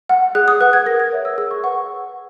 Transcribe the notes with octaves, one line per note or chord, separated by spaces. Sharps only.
F#5
G#4 F#6
D#6
B4 F#5 F#6
G#6
A#4 A#6
G#6
C#5 E5
E6
G#4 E6
C#6
B4 F#5 C#6